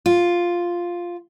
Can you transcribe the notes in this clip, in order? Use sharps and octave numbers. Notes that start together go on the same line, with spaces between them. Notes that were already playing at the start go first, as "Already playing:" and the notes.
F4